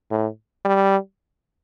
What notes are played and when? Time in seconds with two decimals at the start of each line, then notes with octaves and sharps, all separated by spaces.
0.11 A2
0.65 G3